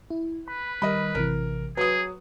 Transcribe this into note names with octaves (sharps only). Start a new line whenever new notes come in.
E4
B4 B5
D#3 G3 A#4 D#5 B5
A1 C3 E3 A#4
F#3 G#4 B4 D#6